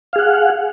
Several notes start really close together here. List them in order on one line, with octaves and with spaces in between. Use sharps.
F5 G#4 F#5